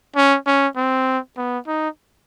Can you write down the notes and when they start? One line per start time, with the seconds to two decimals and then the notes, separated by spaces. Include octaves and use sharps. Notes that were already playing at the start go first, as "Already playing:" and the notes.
0.16 C#4
0.46 C#4
0.76 C4
1.37 B3
1.67 D#4